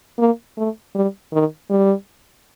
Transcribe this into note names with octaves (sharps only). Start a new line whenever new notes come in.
A#3
A3
G3
D#3
G3